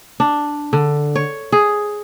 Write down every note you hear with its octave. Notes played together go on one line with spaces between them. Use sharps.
D4
D3
C#5
G#4